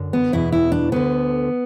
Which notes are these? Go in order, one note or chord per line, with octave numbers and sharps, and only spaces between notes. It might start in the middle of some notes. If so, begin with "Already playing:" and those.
Already playing: F#2 D3
B3
E2 B2 E4
E4
D4
D2 D3 B3